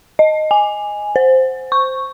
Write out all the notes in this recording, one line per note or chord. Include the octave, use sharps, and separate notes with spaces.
D#5
G#5
C5
C#6